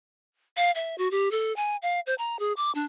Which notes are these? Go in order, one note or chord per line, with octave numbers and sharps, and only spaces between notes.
F5
E5
F#4
G4
A4
G#5
F5
C5
A#5
G#4
D6
D4